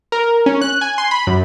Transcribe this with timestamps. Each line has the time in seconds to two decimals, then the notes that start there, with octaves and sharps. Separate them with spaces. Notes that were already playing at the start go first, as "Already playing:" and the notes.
0.12 A#4
0.46 C#4
0.62 F#6
0.81 G#5
0.98 C6
1.11 B5
1.27 F#2